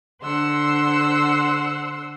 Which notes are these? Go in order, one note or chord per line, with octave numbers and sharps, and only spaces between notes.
D3 C5 F#5 C6 E6